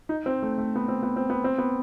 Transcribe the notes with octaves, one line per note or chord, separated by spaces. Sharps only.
D#4
C4
A3
A3
B3
C4
B3
C4
B3
C4
B3